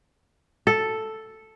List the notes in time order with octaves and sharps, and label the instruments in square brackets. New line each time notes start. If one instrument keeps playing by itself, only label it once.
[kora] A4